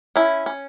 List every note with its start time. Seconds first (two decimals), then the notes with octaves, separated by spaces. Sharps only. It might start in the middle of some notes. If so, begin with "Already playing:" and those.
0.16 C#4 E4
0.46 C#4